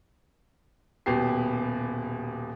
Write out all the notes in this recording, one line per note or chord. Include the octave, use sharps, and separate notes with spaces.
D#1 B2 G4 C7